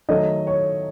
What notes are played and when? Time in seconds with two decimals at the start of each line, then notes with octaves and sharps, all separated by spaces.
0.09 D#3 F#3 A3 D#5
0.47 C#5